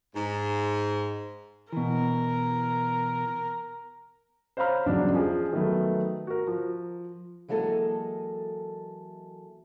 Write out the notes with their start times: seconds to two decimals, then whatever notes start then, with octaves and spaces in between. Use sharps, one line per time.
0.15 G#2
1.72 B2 E3 A#4
4.57 C5 C#5 F5 A#5 B5 F6
4.86 E2 G2 C#3 F#3 D4 D#4
5.14 F3 G#4
5.53 D#3 F#3 A3 B3
6.27 F#4 A#4
6.47 F3
7.48 E3 F#3 G#3 A#3 A4 D#5